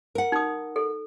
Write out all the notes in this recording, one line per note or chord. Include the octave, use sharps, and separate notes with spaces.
A#4 F#5
D#4 D#6
A4